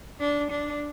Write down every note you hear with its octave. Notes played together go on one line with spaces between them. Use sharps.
D4
D4